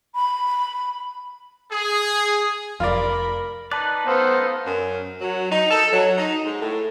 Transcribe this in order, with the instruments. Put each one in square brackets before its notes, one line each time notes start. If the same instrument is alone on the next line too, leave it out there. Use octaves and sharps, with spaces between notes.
[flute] B5
[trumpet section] G#4
[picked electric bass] F1 F2 [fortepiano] F4 D5 [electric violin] A#4 B5
[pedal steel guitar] D#4 B4 D5 [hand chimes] A5 F#6
[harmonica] B3 C5 [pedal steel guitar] D#4 A4 [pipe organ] B4 F5
[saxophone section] F#2
F#3
D#4
A4
F#3
D#4
G#2
A2